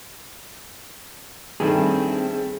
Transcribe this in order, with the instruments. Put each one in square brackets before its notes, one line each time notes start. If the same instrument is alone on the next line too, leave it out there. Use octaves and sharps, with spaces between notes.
[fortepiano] G2 D#3 A3 [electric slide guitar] C4 G#4